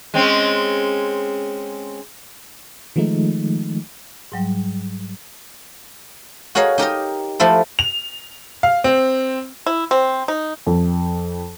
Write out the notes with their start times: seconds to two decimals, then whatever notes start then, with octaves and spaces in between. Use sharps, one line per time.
0.14 G#3 C4 C#4
2.96 D#3 F3 G#3 A3 D#4
4.32 G#2 F#3 G3
6.55 F#4 G#4 A#4 C#5 D#5 F5
6.78 D#4 G4 A#4 D#5
7.40 F3 A3 E4 A4 C5
7.79 F7
8.63 F5
8.84 C4
9.66 E4
9.91 C4
10.28 D#4
10.67 F2